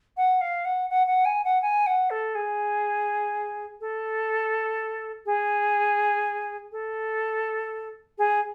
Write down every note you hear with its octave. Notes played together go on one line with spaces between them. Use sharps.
F#5
F5
F#5
F#5
F#5
G#5
F#5
G#5
F#5
A4
G#4
A4
G#4
A4
G#4